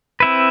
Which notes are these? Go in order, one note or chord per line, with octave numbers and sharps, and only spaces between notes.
C4 E4 B4